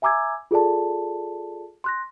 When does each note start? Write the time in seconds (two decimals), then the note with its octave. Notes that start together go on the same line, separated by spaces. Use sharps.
0.02 E5 G#5 A#5 D6 E6 G#6
0.51 F4 G#4 A4 D5 A5
1.84 C6 F#6 A#6